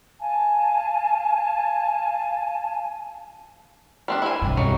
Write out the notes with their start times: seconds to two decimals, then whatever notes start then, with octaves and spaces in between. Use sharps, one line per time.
0.20 F5 G#5 A5
4.08 G3 C4 D4
4.22 E4 G#5
4.42 C2 G2
4.57 C2 F#3 D#4